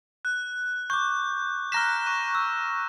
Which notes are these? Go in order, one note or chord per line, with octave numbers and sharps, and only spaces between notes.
F#6
C#6 D6 G6
A#5 F6 F#6 A#6 B6 E7
C#6
E6